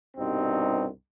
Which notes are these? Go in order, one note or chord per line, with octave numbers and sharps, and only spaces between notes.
C2 G2 B2 C4 D#4